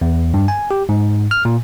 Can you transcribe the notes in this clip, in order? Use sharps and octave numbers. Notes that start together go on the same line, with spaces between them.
E2
G2
G#5
G4
G#2
F6
A#2